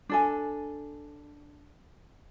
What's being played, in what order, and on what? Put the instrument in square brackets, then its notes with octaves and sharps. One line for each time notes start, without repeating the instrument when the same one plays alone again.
[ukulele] D4 A4 G#5